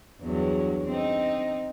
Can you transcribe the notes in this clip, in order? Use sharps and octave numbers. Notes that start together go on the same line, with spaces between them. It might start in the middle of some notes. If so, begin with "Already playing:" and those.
E2 G2 F#3
C4 D#4